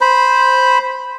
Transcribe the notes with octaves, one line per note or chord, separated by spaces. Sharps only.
C5 B5